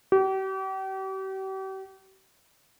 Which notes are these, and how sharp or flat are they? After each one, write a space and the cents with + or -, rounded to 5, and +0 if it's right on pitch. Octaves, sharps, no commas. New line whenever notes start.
G4 -40